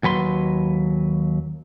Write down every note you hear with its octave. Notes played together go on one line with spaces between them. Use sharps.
D#2 F#3 B4 C6